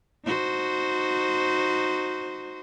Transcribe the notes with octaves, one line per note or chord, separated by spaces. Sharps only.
D#4 F#4 C5